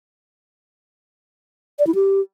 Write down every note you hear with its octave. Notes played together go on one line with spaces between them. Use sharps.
D5
E4
G4